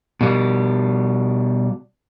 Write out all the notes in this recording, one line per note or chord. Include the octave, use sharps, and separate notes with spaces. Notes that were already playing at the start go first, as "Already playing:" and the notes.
B2 G3